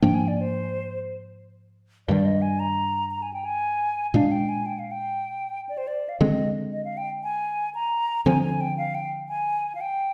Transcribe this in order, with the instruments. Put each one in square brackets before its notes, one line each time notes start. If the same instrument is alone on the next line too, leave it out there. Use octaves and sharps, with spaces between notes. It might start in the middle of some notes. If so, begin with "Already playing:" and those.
[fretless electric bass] G#2 F3 A#3 D4 [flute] G5
[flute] G#5
D5
C5
[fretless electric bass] G2 D#3 G3 [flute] D5
[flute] D#5
G#5
A#5
A#5
G#5
G5
G#5
[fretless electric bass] A#2 G#3 D4 [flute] F5
[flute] G5
G#5
G5
F5
G5
D5
C5
D5
F5
[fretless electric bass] D3 G#3 C4 [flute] D#5
[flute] D#5
F5
G5
G#5
A#5
[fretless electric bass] D3 F3 C4 [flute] G#5
[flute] G#5
G5
F5
G5
G#5
F5
G5